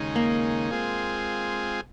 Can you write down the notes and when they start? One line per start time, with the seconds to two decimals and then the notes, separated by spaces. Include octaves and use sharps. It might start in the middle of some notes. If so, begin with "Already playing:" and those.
Already playing: D#2 C#3 G#3 D#4
0.16 A#3
0.71 G#3 C4 F4 G#4